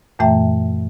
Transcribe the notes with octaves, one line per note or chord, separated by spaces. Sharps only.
F#2 A#2 E3 A3 E5 G5